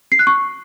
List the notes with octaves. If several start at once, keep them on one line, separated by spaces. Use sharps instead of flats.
C7
F#6
C#6